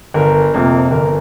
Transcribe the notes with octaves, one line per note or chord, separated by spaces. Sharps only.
G1 A#4
F2 C3 A#3
G1 A#4